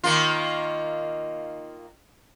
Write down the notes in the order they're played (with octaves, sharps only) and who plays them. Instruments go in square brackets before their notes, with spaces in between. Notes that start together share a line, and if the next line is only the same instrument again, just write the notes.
[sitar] D#3 A#3 F4